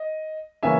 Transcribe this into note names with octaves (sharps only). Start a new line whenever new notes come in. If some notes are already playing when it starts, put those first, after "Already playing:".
Already playing: D#5
C#3 E3 A#3 C#4 E5 G#5